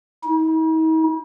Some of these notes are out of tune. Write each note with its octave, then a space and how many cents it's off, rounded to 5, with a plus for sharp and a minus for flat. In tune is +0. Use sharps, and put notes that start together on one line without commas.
D#4 +45